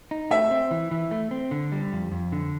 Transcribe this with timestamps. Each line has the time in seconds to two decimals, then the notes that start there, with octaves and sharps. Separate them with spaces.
0.11 D#4
0.31 A3 E5
0.51 C4
0.71 E3
0.91 E3
1.11 A3
1.31 C4
1.51 D3
1.72 G3
1.93 F2
2.12 F2
2.32 D3